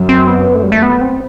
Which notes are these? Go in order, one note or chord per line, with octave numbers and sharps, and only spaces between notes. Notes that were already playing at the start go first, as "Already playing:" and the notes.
Already playing: F#2
C4
B3
A3
G3
A3
B3
C4